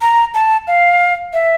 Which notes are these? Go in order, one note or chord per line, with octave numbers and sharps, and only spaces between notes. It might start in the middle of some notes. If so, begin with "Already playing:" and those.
A#5
A5
F5
E5